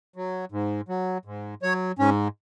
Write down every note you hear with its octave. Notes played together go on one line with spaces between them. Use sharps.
F#3
G#2
F#3
G#2
F#3 C#5
G#2 C#4